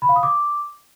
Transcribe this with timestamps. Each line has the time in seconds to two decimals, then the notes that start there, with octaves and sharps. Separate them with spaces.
0.02 B5
0.09 F5
0.16 D#6
0.23 D6